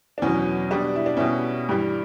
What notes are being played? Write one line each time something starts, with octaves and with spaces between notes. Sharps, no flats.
D4
E2 B2 F#3 C#4
B2 G3 D4
E4
D4
B2 G3 C#4 E4
G2 E3 G3